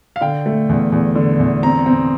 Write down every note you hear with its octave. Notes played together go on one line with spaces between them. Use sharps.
F5
D3 G5
A3
E2
E2
D3
E2
C4 A#5
C4